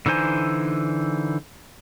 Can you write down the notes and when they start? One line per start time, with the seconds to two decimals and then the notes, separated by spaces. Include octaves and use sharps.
0.06 D3 E3 D#4 C5 G#5